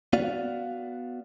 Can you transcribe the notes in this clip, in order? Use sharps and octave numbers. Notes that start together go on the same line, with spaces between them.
B3 F#4 D5 F5